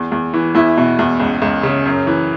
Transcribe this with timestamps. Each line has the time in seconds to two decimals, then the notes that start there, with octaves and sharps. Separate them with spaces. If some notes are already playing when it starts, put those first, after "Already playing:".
Already playing: E2
0.12 E2
0.34 E3
0.54 E2 E4
0.77 B2
0.99 E2
1.20 C#2
1.42 C#2
1.63 C#3
1.86 F#2
2.07 E3